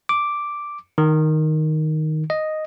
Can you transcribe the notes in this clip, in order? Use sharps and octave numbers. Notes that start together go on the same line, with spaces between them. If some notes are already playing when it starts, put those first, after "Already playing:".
D6
D#3
D#5